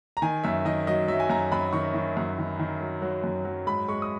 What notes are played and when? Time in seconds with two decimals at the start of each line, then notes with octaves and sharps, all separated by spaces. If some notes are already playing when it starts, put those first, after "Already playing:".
0.17 A#5
0.22 D#3 G#5
0.44 F#2 E5
0.65 D#3 D#5
0.87 F#3 D#5
1.08 F#3 E5
1.20 G#5
1.30 F#2 A#5
1.52 F#2 B5
1.73 D#3 C#6
1.94 D#3
2.17 F#2
2.38 D#3
2.59 D#3
2.81 F#3
3.02 F#3
3.24 F#2
3.45 F#3
3.67 G#2 B5
3.88 G#3 C#6
4.02 D#6